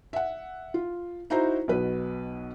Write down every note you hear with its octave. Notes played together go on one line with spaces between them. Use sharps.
E5 F#5
F4
D#4 E4 F#4 C5 A#5
B1 B2 B4